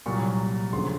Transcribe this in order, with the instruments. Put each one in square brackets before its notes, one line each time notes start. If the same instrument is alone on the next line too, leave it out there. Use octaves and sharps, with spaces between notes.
[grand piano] C2 A#2 F#3 C#6
D2 C#3 F3 C6